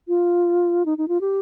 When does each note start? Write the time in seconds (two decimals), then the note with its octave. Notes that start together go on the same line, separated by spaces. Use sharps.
0.08 F4
0.86 D#4
0.98 D#4
1.08 F4
1.21 G4